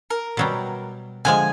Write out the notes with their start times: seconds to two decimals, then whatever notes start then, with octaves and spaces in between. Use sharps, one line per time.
0.10 A#4
0.37 B2 F#3 G3
1.25 D3 F3 G#3 G#5